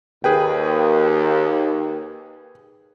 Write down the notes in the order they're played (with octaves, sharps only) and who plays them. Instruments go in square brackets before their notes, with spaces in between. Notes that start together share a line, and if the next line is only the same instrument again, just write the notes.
[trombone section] D#2 [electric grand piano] G#4 B4 G5